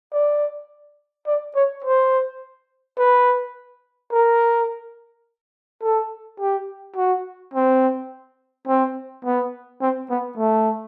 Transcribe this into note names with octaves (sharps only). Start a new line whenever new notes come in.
D5
D5
C#5
C5
B4
A#4
A4
G4
F#4
C4
C4
B3
C4
B3
A3